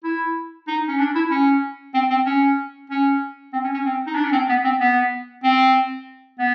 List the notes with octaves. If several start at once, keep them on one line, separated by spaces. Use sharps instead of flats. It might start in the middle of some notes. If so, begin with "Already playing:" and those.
E4
D#4
C#4
D4
E4
C#4
C4
C4
C#4
C#4
C4
C#4
C#4
C4
D#4
D4
C#4
C4
B3
C4
B3
C4
B3